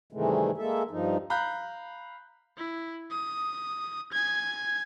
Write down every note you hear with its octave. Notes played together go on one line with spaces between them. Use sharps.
G2 C3 D#3 E3 G#3 A3
G#3 A#3 A4 E5
G2 F3 D#4
F5 A#5 B5 F#6 G6
E4
D#6
G#5 G#6